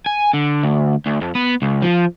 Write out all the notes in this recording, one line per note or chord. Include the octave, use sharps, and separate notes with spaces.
G#5
D3
D2
D2
F2
B3
C#2
F3